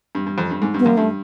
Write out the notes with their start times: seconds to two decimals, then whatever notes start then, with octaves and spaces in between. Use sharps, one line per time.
0.15 G2
0.26 G2
0.38 F2
0.51 G2
0.62 G#2
0.74 G2
0.79 B3
0.85 F#2 A#3
0.97 G2 A3